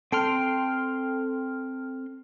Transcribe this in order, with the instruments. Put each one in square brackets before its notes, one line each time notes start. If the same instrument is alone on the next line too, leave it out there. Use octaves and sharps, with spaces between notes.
[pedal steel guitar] C4 G5 C6 [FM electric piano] A4 F6